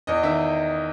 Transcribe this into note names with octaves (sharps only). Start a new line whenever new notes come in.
E2 D#5
D#3 E5